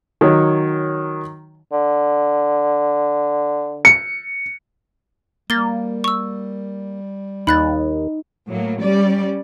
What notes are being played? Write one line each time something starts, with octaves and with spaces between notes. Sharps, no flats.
D#3 F#3 C#5
D3
C#7
G3 A#3 A6 G7
C#6 E6
D#2 D#4 B5 F#6 A6
A2 F#3 A#3
G3 C#4 D5